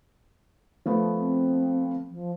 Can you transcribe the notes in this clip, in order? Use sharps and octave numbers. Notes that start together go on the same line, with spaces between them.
F3 A3 B3
C4
F3